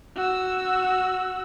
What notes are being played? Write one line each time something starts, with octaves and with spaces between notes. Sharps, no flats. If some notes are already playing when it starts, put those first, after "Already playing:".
F#4 E6